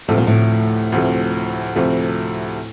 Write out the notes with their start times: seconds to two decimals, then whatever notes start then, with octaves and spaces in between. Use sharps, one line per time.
0.08 D2 A2 C3 F3 A3
0.18 A#2
0.27 A2
0.92 D2 C3 F3 A3
1.76 D2 C3 F3 A3